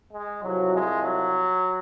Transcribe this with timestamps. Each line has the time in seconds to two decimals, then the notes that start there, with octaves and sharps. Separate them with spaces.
0.13 G#3
0.43 C2 C3 F3 F#3
0.74 G#3
1.03 F#3